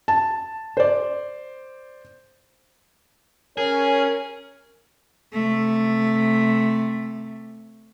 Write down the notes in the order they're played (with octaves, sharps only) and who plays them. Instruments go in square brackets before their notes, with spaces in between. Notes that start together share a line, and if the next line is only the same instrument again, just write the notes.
[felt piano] A5
C5 D5
[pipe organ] C#4 [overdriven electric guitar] G#4 [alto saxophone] A#4 [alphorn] C#5
[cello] C3 A3